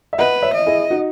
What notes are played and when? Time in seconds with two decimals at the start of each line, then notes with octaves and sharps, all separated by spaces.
0.13 E5
0.18 B4 D#5 F#5
0.42 C#5 E5
0.54 D#5
0.66 E4 G#4
0.91 D#4 F#4